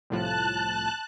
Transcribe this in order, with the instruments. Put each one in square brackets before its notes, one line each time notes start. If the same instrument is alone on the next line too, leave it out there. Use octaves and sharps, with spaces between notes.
[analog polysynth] C2 A2 F3 [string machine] A5 F#6